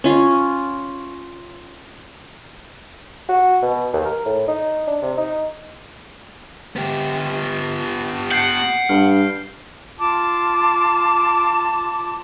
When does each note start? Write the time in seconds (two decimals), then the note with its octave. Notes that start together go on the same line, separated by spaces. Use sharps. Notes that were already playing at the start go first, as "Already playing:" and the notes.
0.04 C#4 F4
3.29 F#4
3.62 B2
3.93 D#2
4.05 A#4
4.26 A2
4.48 D#4
4.87 D4
5.02 C3
5.18 D#4
6.76 B3 G4
8.31 F#5 G6 C7 D7
8.89 G2 F6
9.99 F4 A5 D6